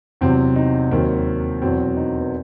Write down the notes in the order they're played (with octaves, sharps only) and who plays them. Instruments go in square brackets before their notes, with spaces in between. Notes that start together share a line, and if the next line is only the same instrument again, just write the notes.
[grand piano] E2 C3 F#3 C4
D#4
D#2 D#3 F#3 C4
E2 B2 F#3 C4
D#4
B3